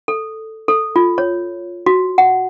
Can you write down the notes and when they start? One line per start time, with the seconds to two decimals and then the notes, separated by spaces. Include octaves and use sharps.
0.08 A4
0.68 A4
0.96 F4
1.18 C#5
1.86 F#4
2.18 F#5